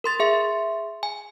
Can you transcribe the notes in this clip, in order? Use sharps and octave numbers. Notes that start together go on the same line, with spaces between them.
A#4 C6 A6
G#4 E5 C6
G#5